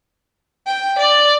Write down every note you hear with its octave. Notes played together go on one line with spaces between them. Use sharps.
G5
D5